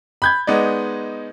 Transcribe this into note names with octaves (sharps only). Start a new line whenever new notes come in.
B5 G6 G#6
G#3 B3 D#4 D5